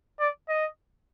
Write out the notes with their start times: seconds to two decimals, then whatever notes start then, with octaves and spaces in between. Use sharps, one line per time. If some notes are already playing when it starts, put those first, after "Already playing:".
0.20 D5
0.49 D#5